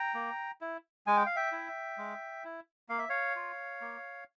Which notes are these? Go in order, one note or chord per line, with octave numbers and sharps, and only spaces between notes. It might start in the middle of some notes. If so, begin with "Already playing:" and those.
Already playing: G5 A#5
A#3
E4
G#3 G#5
G5
F5
E5 G5
E4
G#3
E4
A#3 F5
E5
C#5 F5
F4
A#3